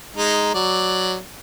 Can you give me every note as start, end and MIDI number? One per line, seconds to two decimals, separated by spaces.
0.16 0.50 56
0.16 0.50 63
0.54 1.16 54
0.54 1.16 74